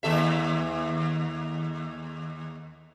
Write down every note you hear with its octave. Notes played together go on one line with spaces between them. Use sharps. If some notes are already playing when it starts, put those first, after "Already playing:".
D#2 A4 E5